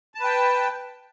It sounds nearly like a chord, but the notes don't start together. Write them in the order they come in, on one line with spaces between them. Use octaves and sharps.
A5 B4 G5